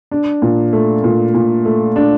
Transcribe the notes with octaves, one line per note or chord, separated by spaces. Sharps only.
D4
A#2
A3
A#2
A#2
A3
D4